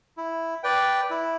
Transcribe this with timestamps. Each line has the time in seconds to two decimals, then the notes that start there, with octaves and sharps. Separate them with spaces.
0.17 E4
0.63 B4 D5 G5
1.10 E4